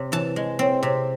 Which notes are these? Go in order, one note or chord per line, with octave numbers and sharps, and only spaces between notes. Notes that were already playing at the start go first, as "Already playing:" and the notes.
Already playing: C3 C4
E3 A5
G#3
C4
C3